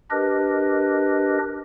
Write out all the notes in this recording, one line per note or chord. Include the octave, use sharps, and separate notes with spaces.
D4 G4 A#4 B4 D#5